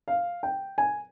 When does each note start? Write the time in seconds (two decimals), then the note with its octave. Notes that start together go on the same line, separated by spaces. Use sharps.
0.08 F5
0.43 G5
0.78 G#5